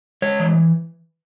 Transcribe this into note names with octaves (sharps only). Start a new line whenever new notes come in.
G#3 C#5
E3